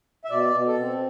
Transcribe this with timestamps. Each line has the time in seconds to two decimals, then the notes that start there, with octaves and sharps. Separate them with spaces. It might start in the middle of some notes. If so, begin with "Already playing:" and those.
0.25 E5
0.30 B2 D5
0.55 B2
0.67 A4
0.80 C4